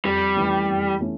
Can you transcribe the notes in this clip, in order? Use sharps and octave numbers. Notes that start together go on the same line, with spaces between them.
F2 G3
E3 A3 C#4 E4
F2
E3 A3 C#4 E4